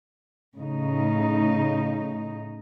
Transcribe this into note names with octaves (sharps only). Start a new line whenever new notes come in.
A2 C#3 D#4